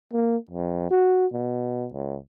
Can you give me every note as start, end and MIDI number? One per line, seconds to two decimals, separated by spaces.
0.13 0.37 58
0.51 0.90 41
0.91 1.26 66
1.33 1.87 47
1.93 2.16 37